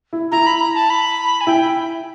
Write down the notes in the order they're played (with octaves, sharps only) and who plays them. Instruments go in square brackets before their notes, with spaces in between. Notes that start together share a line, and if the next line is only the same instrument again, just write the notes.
[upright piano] E4
[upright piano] E4 [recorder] A#5
[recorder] B5
A#5
A5
B5
G#5
[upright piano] E4 [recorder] G5